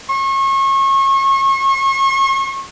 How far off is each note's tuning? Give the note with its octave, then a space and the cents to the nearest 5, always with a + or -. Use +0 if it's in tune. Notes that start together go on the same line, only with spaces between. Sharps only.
C#6 -35